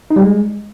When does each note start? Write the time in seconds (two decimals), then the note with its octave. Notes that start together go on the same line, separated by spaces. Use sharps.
0.10 D#4
0.16 G3
0.22 G#3